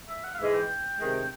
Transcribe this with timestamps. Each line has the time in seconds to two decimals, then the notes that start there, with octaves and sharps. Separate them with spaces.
0.09 E5
0.24 F#5
0.34 F5
0.39 G#2 E3 G#3 E5
0.54 G5
0.99 C3 D#3 G#3